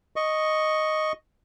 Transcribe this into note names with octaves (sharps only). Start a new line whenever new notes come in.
D#5 C#6